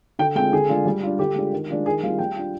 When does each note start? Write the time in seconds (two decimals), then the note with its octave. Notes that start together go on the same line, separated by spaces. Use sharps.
0.19 D3 G5
0.35 G#3 C4 F4 G5
0.52 D3 G#4
0.69 G#3 D4 F4
0.86 G3
1.03 D4 F4
1.19 D3 G4
1.36 G#3 D4 F4
1.53 D#3
1.70 G#3 D4 F4
1.86 D#3 G#4
2.03 G3 C4 F4 F5
2.19 G3 G5
2.36 D4 F4